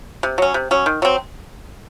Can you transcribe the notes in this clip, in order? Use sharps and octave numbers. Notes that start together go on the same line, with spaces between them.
C3
F#3 C#4
C3
F#3 C#4
D#3
F#3 C4